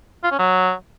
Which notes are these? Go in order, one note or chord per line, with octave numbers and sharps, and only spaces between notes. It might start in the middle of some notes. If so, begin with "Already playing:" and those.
F4
C#4
F#3